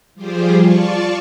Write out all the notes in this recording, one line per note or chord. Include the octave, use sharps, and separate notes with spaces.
F3 G3 F4 G4 G#4 C5
F4 D5 A5 C#6